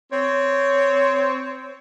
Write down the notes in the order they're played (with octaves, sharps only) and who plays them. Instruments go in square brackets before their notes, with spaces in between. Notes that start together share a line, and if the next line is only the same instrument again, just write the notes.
[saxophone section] C4 C#5